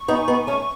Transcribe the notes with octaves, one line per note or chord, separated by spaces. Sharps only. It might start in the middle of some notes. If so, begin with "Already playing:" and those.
Already playing: C#6
B3 D#4
G#5
B3 D#4
C#6
A3 C#4